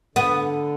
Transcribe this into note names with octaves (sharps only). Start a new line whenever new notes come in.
D3 B3